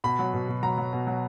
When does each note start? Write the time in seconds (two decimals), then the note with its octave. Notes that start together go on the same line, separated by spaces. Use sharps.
0.04 B2 B5
0.19 F#3
0.34 B2
0.48 B2
0.63 F#3 A#5
0.78 F#3
0.93 B2
1.07 F#3